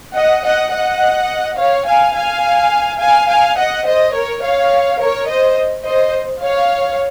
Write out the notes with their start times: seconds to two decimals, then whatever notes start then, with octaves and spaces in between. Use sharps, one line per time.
0.15 D#5 F#5
0.44 D#5 F#5
0.72 D#5 F#5
1.58 C#5 F5
1.86 F5 G#5
2.15 F5 G#5
3.00 F5 G#5
3.29 F5 G#5
3.57 D#5 F#5
3.86 C5 D#5
4.14 A#4 C#5
4.43 C#5 F5
5.01 A#4 C#5
5.29 C5 D#5
5.85 C5 D#5
6.43 C#5 F5